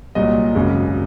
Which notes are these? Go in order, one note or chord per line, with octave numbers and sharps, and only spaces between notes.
C2 A#2 F#3 D#5
G#1 F#2 C#3